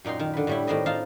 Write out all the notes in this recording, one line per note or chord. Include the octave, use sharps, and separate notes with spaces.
F#2 A#2 D#4 G5 C6
D#3
D3 B4
A2 G3 E4
A2 D#3 C4 D4 D#5
D#4 F4 F5 A5